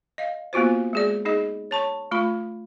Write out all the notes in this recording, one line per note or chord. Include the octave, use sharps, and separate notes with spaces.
D#5 F5
A#3 B3 F4 F#4 C5
G#3 G#4 D5
D#4 G#4 D#5
C#5 A5 C#6
A3 F4 B5